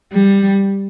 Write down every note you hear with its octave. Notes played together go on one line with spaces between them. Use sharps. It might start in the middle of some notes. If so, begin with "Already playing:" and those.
G3